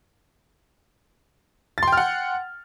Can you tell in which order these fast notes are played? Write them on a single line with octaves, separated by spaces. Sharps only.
A6 C6 G5 F6 F#5